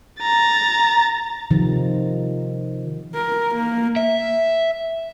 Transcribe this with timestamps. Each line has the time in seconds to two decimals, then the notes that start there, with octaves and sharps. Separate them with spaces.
0.21 A#5 A6
1.51 C3 D#3 F3
3.15 A#4
3.55 A#3
3.96 E5